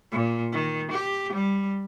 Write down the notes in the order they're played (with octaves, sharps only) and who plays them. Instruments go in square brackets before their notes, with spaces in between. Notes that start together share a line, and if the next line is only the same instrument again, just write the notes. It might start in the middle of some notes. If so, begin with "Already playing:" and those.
[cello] A#2
D#3
G4
G3